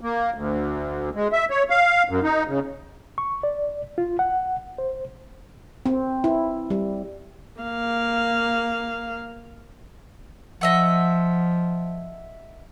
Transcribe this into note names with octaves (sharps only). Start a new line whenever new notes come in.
A#3
D2
G#3
E5
C#5
F5
F#2
D#4
C#3
C#6
D5
F4
F#5
C5
C4
E4
G3
A#3 F5
F3 D#5 E5 F#5